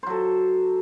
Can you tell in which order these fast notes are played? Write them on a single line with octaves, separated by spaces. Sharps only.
C5 F#3 A4